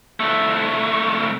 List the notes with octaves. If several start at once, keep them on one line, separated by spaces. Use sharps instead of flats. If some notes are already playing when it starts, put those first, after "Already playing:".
C2 A3